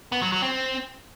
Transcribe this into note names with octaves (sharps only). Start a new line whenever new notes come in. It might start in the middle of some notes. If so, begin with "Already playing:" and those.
B3
F#3
F#3
C4